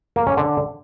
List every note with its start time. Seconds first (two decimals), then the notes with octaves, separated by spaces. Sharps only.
0.16 A#3
0.27 C#4
0.37 D3